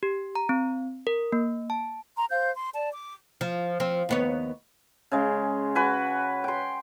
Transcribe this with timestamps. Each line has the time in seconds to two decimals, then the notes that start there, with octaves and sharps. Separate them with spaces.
0.03 G4
0.35 A#5
0.49 C4
1.07 A#4
1.32 A#3
1.70 A5
2.16 A#5 C6
2.30 C5 F5 G6
2.56 C6
2.74 D5 A5
2.92 D6
3.41 F3
3.80 F3 C4
4.09 D#2 B3 C#5
5.11 C#3 G#3
5.75 F#4 B4 G#5
6.44 G5 C6